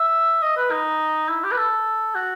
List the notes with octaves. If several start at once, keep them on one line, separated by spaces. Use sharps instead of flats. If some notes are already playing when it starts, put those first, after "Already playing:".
Already playing: E5
D#5
B4
D#4
E4
G4
B4
A4
F#4